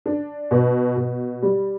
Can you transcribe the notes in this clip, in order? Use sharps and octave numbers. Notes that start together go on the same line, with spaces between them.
D4
B2
B2
G3